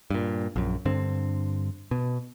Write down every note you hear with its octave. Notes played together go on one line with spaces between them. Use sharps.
G2 A#2
A#1 F#2
G2 D3 C4
B2